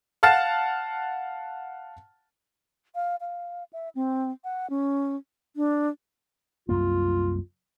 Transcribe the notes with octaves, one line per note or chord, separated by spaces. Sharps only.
F5 F#5 A5 F6 A6 E7
F5
F5
E5
C4
F#5
C#4
D4
C2 F#2 A#3 F4